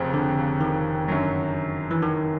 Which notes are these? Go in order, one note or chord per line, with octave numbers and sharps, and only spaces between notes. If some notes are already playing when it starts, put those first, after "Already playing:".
Already playing: F1 F2 C#3 F3
D3
D#3
F#2 D3 F#3
E3
D#3